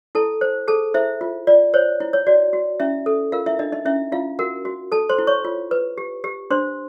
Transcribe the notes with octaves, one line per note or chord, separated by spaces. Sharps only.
E4 A4 A5
C5
G#4 A4 A5
E4 C5 E5
F4
F4 D5
C5 C#5
E4
C#5
F#4 D5
F#4
C#4 E4 E5
A4
F4 A#4 F5
E4 E5
D4 D#4 D#5
D#4 D#5
C#4 E4 E5
E4 F4 F5
F#4 A#4 F#5
F#4
A4 A5
C5 C6
E4
C#5 C#6
F4
B4
G4
G4
D4 C5 C6